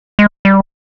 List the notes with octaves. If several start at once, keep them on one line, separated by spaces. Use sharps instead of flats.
G#3
G3